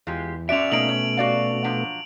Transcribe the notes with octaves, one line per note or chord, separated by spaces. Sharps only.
E2 G#3 F4 G4
C#4 F#4 D5 E5 D7 F7
B2 A3 A#3 D#4 D7 F#7
C#5
F#4 D5 F5
F3 F#3 D4